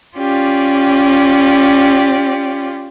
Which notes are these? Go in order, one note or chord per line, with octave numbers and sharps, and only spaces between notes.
C#4 F4 G4 D5